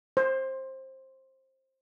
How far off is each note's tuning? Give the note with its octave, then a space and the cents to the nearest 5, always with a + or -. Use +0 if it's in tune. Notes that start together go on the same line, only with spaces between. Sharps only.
C5 +15